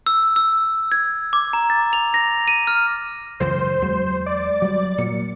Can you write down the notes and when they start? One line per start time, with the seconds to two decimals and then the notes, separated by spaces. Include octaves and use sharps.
0.06 E6
0.36 E6
0.92 G#6
1.33 D6
1.53 A#5
1.70 A6
1.93 F7
2.14 A#6
2.48 D#7
2.67 F6
3.40 C#2 F#2 E3 C5
3.81 E2 F#3 G#3
4.26 D5
4.62 F#3 G3
4.98 A#2 F#3 C#7